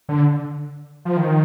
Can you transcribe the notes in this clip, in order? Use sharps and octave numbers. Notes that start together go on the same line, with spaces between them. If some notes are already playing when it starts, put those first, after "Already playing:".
D3
F3
D#3